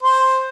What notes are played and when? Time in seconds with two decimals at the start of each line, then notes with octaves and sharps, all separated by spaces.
0.03 C5